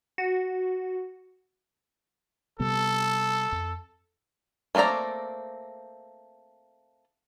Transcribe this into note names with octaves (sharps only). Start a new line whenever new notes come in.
F#4
C3 G3 B3 A4
F2
A3 A#3 C4 D5 A#5